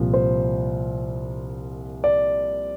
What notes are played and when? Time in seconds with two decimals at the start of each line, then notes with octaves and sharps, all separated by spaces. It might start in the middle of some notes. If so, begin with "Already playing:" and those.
Already playing: C2 A#2 F3
0.14 C5
2.04 D5